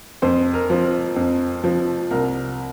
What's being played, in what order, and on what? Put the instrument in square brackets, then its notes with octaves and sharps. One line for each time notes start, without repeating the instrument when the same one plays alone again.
[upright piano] F2 C5
A#4
F3 C4
F2
F3 C4
C2 A#4